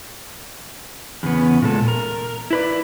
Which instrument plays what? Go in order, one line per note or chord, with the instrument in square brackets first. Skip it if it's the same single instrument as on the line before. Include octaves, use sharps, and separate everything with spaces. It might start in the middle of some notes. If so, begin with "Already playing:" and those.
[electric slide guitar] E2 C#3 B3
A#2 G#3 A4
A#4
E4 B4 D5